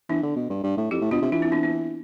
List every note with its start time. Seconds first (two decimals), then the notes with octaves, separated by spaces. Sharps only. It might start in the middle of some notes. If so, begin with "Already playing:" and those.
0.09 E3 B3 D4
0.23 D3
0.36 B2
0.50 G2
0.64 G2
0.77 A2
0.91 F2 E4 G4
1.01 A2
1.11 B2 D4 F4
1.22 C3
1.32 E3 D4 F4
1.42 C4 E4
1.52 B3 D4
1.63 B3